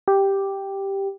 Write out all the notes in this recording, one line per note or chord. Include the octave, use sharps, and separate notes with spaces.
G4